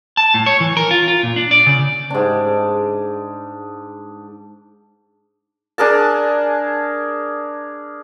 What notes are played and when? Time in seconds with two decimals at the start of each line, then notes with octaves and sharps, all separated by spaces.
0.17 A5
0.34 A2
0.46 C#5
0.60 E3
0.77 A#4
0.91 F4
1.08 F4
1.23 A#2
1.36 D4
1.51 D5
1.66 C#3
2.10 G#2 D4
5.78 D4 G#4 A#4 A5